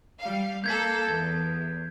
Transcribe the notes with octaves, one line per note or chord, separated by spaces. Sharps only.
G3 F5
A#3 A4 G6 G#6 B6
E2 G#6